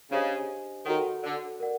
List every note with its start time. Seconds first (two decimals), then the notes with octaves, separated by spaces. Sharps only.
0.10 C#3 D4 G4 C5 D#5 G#5
0.86 D#3 F#4 A4 C#5 F#5
1.23 D3
1.60 A#4 D5 F#5